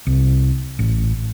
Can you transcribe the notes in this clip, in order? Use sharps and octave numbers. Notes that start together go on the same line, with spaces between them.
C2
A1